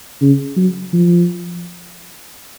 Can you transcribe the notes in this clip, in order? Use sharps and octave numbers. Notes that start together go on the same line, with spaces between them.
C#3
F#3
F3